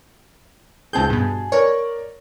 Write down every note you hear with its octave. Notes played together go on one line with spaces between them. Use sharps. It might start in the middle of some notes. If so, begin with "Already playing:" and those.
C#2 C4 G#4 G#5 A5 G6
G2 B2
A#4 C#5 D5